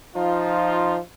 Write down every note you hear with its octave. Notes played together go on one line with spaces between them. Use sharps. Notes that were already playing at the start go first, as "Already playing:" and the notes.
F3 D#4 F4